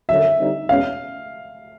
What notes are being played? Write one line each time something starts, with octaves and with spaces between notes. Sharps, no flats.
F#2 D3 F#3 E5
D3 G3 C4 D#4
E2 B2 G#3 C#4 F5